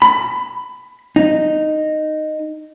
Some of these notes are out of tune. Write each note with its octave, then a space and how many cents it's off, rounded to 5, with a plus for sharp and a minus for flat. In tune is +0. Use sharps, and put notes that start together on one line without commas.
B5 +20
D#4 -10